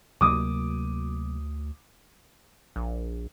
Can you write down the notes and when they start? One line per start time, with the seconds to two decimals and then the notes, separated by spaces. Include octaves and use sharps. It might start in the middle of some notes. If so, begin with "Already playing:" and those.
0.21 D2 C3 F#3 A#3 D6 D#6
2.76 A#1